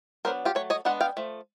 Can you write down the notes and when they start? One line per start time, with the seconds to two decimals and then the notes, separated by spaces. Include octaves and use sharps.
0.25 F#3 B3 D4 A#4 C5
0.45 F4 G4
0.55 F#3 A3 C#5
0.70 C#5 D#5
0.85 G#3 B3 D4 F#5
1.01 F5 G5
1.17 F3 A3